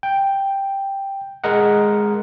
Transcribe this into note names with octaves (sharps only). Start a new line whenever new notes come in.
G5
G#3 A#4 D#5 F#5